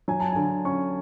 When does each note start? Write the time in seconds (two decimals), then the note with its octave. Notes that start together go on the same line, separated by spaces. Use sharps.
0.08 F#3 G#5
0.20 A5
0.32 D3 G#5
0.65 C#4 C#6